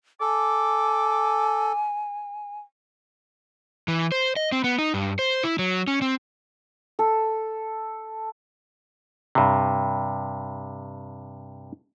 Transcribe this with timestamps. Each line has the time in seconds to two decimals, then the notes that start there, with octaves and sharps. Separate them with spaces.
0.21 A4 G#5 D6
3.88 E3
4.12 C5
4.36 D#5
4.52 C4
4.64 B3
4.79 D#4
4.94 G2
5.19 C5
5.43 E4
5.59 F#3
5.87 C#4
6.02 C4
6.99 A4
9.35 G2 C3